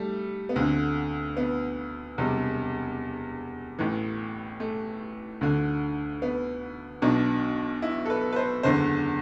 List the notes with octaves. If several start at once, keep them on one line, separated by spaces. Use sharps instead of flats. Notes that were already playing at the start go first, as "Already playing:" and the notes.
Already playing: G3 A3
B3
D2 D3 C4
B3
E1 E2 C3 G3
A1 A2 E3
A3
D2 D3
B3
B1 B2 D4
E4
A4
B4
B4
C5
F#1 E2 D3 C5